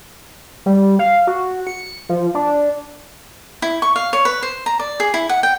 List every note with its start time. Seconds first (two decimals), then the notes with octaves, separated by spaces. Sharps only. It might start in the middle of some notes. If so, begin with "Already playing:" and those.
0.66 G3
0.99 F5
1.27 F#4
1.67 C#7
2.09 F3
2.35 D4
3.62 E4
3.82 C#6
3.96 F5
4.13 C#5
4.25 B4
4.43 C5
4.66 A#5
4.79 D5
5.00 G#4
5.14 E4
5.29 F#5
5.43 G5